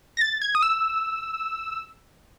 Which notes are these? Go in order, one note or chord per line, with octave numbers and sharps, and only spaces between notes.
A#6
A6
G#6
D#6
E6